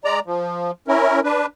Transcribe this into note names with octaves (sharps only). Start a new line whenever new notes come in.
G#3 D5 A#5
F3
C#4 E4 A#4
D4 B4